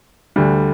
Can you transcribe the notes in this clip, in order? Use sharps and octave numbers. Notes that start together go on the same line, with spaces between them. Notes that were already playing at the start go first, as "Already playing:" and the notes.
D2 D3 G3